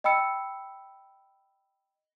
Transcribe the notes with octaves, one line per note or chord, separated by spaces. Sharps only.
D#5 G5 B5 E6 C#7